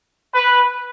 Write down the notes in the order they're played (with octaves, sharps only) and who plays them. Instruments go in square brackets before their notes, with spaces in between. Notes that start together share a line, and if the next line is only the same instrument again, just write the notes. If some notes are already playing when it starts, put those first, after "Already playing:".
[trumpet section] B4